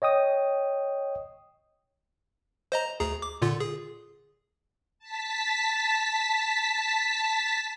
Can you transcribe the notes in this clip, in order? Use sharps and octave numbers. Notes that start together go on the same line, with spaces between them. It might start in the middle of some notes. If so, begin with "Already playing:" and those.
C#5 D#5 G5 D#6
C5 D#5 A#5
D2 G#4 A#5
D6
A#2 D3 F4
G#4
A5 B6